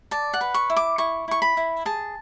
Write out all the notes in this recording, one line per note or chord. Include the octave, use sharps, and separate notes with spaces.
D5 A5
F#5
B4
C#6
E4
D6
E4 C#6
E4 C#6
B5
E4
G#4 A5